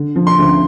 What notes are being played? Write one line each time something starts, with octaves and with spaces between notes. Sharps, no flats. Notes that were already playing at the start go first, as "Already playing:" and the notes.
Already playing: D3
F3
C6
D2